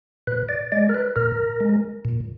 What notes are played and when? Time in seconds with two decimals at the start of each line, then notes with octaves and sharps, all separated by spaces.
0.27 A#2 B4
0.49 D5
0.72 G#3 D5
0.89 A#4
0.94 B4
1.16 A#2 A#4
1.60 G#3
2.05 A#2